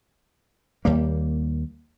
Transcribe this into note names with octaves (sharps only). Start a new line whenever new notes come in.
D#2 G3 A#3